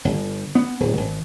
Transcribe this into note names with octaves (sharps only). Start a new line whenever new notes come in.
G1
B3
D1
G#1